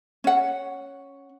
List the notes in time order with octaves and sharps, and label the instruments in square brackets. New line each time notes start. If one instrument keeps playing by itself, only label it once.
[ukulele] C#4 F#5